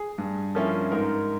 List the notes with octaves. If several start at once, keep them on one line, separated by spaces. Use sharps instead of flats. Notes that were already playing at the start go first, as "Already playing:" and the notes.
Already playing: G#4
G2
F3 A#3 C#4 E4
G#2 A#4